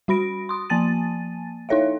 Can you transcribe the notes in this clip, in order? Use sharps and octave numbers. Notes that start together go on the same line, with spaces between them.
G3 F#4 B5 A#6 D7
C6 D#6
F3 A#3 G#5 A5 A6 D#7
D#4 E4 A4 C#5 E5 F5